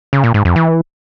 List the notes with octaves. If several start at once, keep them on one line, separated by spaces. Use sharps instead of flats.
C#3
A#2
G#2
F2
E3